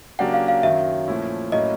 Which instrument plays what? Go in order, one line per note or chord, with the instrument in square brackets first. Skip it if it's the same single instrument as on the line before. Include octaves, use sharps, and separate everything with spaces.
[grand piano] C#3 F#3 A#3 D4 G4 [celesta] F#5
[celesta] F5
F5
[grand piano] F#2 D#3 F#3 [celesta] E5
[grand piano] A#2 F3 A3 C#4 E4
[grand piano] A2 F#3 A#3 C#4 E4 [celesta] D#5